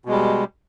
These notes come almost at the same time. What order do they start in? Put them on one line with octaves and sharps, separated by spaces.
B2 G#3 G3